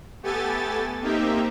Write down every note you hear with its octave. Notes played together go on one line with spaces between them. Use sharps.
A3 B3 G4 A4 G#5 A6
A#3 C4 D#4 G4 E5